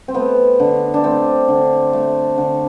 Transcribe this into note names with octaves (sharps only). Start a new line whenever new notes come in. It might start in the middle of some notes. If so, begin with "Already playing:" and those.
C4
A3 B3
D3
D4
A3 C4
D3
A3
D3